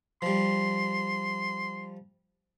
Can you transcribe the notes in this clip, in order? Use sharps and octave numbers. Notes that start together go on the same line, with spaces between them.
F3 G3 C6